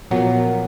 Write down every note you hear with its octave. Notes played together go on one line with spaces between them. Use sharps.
A#2 F3 F#3 B3 F4 A#4